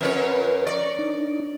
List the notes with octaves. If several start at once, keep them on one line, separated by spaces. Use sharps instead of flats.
F2 C#4 A#4 B4 C#5
D5 A#5 C#6
D4 D#4